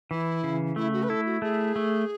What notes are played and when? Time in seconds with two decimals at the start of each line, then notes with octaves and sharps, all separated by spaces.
0.11 E3 E4
0.44 C#3
0.76 A3 E4
0.93 F#4
1.03 B4
1.09 E4 A4
1.26 F#4
1.42 A3 G#4
1.76 A3